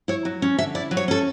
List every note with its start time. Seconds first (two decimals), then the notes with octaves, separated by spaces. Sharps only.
0.08 E4 C#5
0.25 F#3
0.42 C#4
0.58 D3 E5
0.75 E4 D5
0.91 F#3
0.97 C#5
1.08 C#4 A4